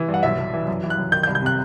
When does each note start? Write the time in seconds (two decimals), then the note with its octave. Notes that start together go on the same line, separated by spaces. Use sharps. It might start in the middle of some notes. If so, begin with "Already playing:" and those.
Already playing: E3
0.08 G2
0.14 F#5
0.23 B1 E5
0.38 B1
0.54 E3
0.68 F#2
0.84 E3
0.90 F#6
0.98 F#2
1.12 D#3 G6
1.23 G6
1.27 C2
1.35 G6
1.42 C3 F#6